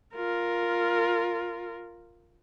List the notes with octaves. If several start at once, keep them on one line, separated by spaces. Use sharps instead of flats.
F4 A#4